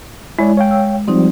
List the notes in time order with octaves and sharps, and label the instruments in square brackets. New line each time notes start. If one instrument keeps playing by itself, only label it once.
[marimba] G#3 [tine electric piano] E4 C#5 D5
[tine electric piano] C#5 F5 G5
[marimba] E6
[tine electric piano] F3 G3 [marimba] C4 D#4